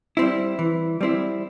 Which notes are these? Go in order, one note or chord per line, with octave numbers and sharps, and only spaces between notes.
G3 C4 E4
E3
G3 C4 E4